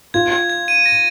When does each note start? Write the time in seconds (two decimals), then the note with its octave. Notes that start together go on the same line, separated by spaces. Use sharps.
0.14 F4 G#6
0.32 G#6
0.50 G#6
0.68 D#7
0.86 A#6